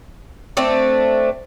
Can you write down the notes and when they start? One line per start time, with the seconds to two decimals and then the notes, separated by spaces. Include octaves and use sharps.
0.57 A3 C4 D4